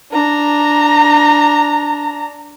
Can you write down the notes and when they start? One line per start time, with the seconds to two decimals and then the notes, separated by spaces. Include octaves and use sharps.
0.12 D4 A#5